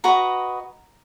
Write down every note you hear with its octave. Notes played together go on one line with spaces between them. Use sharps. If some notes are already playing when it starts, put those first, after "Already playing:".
F#4 B4 D#5 A#5